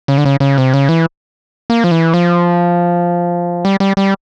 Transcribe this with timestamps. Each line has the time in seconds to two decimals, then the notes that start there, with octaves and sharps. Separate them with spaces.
0.08 C#3
0.18 D3
0.25 C#3
0.40 C#3
0.58 C3
0.74 C#3
0.89 E3
1.70 A#3
1.84 F3
1.91 E3
2.14 F3
3.65 G3
3.80 G3
3.97 G3